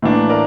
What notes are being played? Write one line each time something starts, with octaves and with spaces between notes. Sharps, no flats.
A2 E3 A#3 D4
A#4 D5